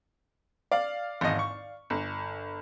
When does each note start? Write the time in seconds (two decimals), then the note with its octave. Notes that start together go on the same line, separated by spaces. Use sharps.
0.72 D5 F5
1.21 G#1 E2 D#5
1.39 C#6
1.90 G1